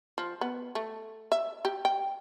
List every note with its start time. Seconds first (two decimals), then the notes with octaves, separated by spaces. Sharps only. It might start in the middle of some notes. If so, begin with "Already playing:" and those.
0.18 F3
0.41 B3
0.75 A3
1.32 E5
1.65 G4
1.85 G5